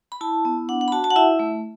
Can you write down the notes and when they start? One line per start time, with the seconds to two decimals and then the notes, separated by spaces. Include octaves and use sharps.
0.12 B5
0.21 E4 A5
0.45 B3
0.69 D4 F#5
0.81 F#5
0.88 B5
0.92 F#4 A5
1.04 A5
1.10 F#5
1.16 E4 E5
1.39 A3